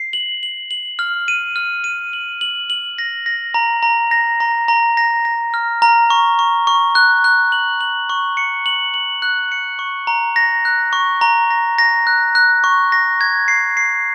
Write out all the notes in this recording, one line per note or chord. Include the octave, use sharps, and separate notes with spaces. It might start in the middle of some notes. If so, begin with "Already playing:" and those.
Already playing: C7
F#7
F#7
F#7
F6
D#7
F6
D#7
F#7
F#7
F#7
A#6
A#6
A#5
A#5
A#6
A#5
A#5
A#6
A#6
F6
A#5
C#6
C#6
C#6
F#6
F#6
F#7
F#7
C#6
C#7
F#7
F#7
F#6
C#7
C#6
A#5
A#6
F#6
C#6
A#5
A#6
A#6
F#6
F#6
C#6
A#6
G#6
C7
C7